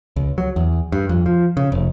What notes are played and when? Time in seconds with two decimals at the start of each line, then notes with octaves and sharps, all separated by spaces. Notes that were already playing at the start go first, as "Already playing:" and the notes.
0.16 C#2
0.38 F#3
0.56 E2
0.92 G2
1.09 F2
1.26 F3
1.57 C#3
1.72 F1